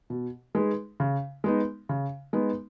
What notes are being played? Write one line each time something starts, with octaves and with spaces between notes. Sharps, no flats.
B2
G#3 D#4 G#4 B4
C#3
G#3 B3 D#4
C#3
G#3 B3 D#4